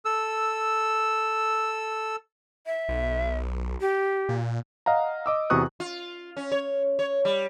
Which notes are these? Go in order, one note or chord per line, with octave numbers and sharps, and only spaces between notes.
A4 E6
E5
B1
G4
A#2
D#5 F5 F#5 A#5
D#5 D6 E6
E2 C3 F#4 C#6 D#6 F#6
F4
C#4
C#5
C#5
G3